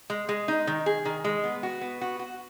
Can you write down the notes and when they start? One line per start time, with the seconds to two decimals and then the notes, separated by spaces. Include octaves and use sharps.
0.10 G#3
0.29 G#3
0.48 D#4
0.67 D#3
0.86 G#4
1.05 D#3
1.24 G#3
1.44 B3
1.63 F#4
1.81 B3
2.01 F#4
2.19 F#4